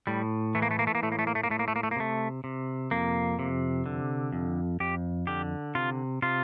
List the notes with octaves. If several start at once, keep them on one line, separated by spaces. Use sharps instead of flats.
A2 G3
E3 A3
A#3
A3
A#3
A3
A#3
A2 A3
A#3
A3
A#3
A3
A#3
A2 A3
A#3
A3
A#3
A3
A#3
C3 A3
C3
F2 A#3
C3
D3
F2
F2 G4
D3 G4
C3 F4
C3 F4